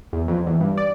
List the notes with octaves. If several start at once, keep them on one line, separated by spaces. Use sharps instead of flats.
E2
F2
E2
G2
D5